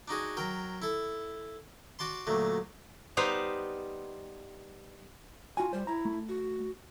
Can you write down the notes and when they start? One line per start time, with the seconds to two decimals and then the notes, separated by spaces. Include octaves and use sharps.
0.08 D4 D#4 F#4 G#4
0.37 F#3 A#4 G5
0.82 E4 A4
1.99 F#4 D5 A5 C6
2.27 D2 A#2 F#3 A3
3.17 G3 B3 D#4 B4 C5 F5
5.57 F4 F#4 G#5
5.73 G3 C5
5.87 E4 A#5
6.05 A3
6.29 F#4